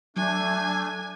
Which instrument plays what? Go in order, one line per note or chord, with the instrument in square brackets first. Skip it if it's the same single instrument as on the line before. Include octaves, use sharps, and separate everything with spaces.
[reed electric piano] F#3 [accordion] A3 D4 [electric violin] G#5